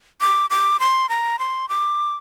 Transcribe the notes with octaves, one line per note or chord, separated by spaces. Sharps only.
D6
D6
C6
A#5
C6
D6